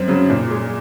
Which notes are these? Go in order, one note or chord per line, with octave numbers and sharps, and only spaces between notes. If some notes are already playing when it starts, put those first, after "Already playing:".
Already playing: F#2 C4
C#3 F#3
A#2
G#3